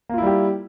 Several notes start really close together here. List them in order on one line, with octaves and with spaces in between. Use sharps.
A#3 F4 E4 G3 G4